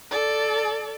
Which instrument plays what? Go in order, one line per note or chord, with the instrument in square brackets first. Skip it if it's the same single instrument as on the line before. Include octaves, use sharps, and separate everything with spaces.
[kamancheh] A4 D5